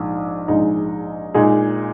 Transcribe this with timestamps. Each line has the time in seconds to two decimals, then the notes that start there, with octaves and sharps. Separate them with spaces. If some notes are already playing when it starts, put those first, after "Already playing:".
Already playing: A#1 G#2 G#3
0.48 A#1 G#2 G#3 D#4
1.34 A#2 G#3 D#4 G#4